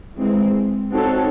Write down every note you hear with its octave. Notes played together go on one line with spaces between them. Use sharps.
E3 G#3 C4
C4 D#4 F#4 A4 C#5